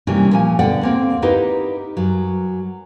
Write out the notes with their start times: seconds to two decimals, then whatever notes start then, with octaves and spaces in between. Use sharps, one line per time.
0.07 C3 E3 G3 A#3 C#4 D4
0.31 A#2 F3 G#5
0.59 B2 D3 D5 F#5 G5
0.81 D#2 A#3 C4
1.22 D#4 E4 G4 A#4 B4 D#5
1.97 F#2 F#3